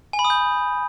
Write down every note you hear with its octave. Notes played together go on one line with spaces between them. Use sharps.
G#5
B5
D#6
G6